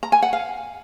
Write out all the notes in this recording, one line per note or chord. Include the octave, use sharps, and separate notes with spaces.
A#5
G#5
F#5
F5